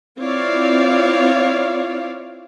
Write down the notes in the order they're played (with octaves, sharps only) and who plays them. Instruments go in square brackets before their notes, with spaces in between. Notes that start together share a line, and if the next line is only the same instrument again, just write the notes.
[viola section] C4 E4 F4 C#5 D5 F5